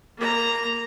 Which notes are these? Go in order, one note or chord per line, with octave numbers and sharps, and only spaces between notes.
A#3 A#5